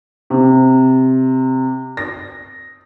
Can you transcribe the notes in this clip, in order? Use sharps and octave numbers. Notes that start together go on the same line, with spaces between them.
C3
A#6